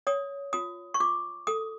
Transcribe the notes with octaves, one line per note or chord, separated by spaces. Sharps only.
C#5 D#6
F4 D#6
C#6
F4 D6
A4 D#6